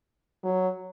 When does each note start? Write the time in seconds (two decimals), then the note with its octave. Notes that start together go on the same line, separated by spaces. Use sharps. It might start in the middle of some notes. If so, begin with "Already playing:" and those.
0.43 F#3